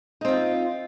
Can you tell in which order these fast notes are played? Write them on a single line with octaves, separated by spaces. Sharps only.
D#4 C4 F4